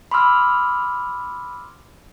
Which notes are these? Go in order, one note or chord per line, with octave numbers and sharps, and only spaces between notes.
B5 C6 D6 E6 F6